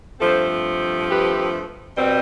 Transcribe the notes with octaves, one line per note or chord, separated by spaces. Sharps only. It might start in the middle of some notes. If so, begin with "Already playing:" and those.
G2 F3 A3 C4 A4 C5
G4 B4
B2 G3 C4